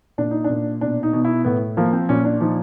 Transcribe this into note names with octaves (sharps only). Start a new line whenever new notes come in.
A#2 D4
D#4
D4
A#2
B2 D4
D#4
B2
E4
A2 B3
F3 A#3
C4
A#2 C#4
D4
F3 D#4